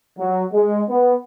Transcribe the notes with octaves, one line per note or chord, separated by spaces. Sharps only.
F#3
G#3
B3